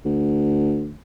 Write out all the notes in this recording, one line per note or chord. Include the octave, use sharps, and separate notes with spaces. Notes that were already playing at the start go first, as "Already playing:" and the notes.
D2